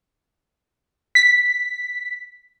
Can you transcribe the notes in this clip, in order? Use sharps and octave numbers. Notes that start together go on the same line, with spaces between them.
B6